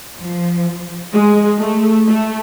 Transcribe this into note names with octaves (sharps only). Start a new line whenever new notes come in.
F3
G#3
A3
A3